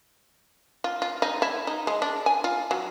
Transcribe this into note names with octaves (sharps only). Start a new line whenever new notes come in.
F4
F4
D#4
E4
D#4
G#3
D4
G#5
F4
F#3